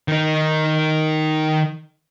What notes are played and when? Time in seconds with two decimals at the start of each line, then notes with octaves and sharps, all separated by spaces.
0.08 D#3 D#4